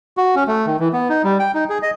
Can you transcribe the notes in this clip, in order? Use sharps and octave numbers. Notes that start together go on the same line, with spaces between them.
F#4
C#4
A3
D#3
E3
B3
D#4
G3
G5
D#4
G#4
D#5